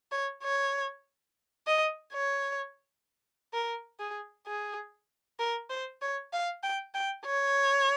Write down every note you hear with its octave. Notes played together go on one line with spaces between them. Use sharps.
C#5
C#5
D#5
C#5
A#4
G#4
G#4
A#4
C5
C#5
F5
G5
G5
C#5